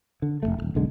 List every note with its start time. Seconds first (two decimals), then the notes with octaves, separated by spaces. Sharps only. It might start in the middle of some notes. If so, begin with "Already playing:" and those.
0.22 D3
0.43 F1 D#2 A3
0.58 D#1 G#1
0.75 B1 F2 D3 G#3